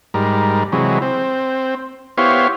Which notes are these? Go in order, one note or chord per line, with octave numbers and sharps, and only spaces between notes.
G#2 G3 A#4
C3 E3 F#3 G#3
C4
B3 E4 G4 C5 C#5 F5